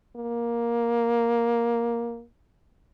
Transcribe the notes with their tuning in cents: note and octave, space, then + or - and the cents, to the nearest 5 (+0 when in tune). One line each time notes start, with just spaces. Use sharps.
A#3 +10